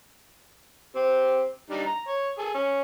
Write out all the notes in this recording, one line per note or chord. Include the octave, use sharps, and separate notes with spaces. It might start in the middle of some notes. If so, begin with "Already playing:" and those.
C4 G4
G3 D4 D#4
A#5
C#5
G#4 A4
C#4